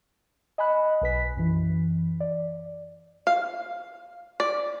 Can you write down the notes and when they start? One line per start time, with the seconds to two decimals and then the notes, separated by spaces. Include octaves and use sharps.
0.58 D#5 G#5 B5 F#6
1.01 B1 B4 B6
1.37 F#2 E3
2.20 D5
3.27 F5
4.40 D5